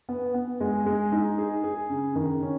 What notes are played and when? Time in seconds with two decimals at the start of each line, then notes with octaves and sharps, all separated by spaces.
0.09 B3
0.34 B3
0.60 G#3
0.86 G#3
1.12 D#4
1.38 G#4
1.64 G#4
1.89 C#3
2.15 D#3
2.42 C#4